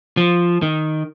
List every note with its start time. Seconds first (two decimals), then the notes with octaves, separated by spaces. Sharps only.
0.17 F3
0.62 D#3